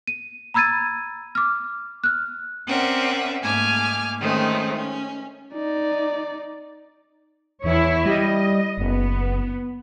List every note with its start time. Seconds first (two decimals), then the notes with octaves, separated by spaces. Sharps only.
0.07 D#7
0.54 A#5 B5 E6 G#6 A6 D#7
1.35 D6 F6
2.04 F6 F#6
2.67 C4 C#4 A#4 D5 E5 F#5
3.42 G#2 A3 A#3 G#5 D6 F6
4.21 D#3 G#3 A3 C4 C#4
4.75 C#4
5.54 D#4 D5
7.64 E2 E4 C#5
8.06 G3 D#5
8.78 F#1 B3